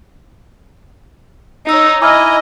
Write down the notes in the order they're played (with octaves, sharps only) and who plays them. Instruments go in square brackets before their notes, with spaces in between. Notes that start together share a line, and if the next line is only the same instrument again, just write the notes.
[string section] D#4 C#5 [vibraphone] E6
[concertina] E4 G#5 A#5 [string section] D#5 [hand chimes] D6 F6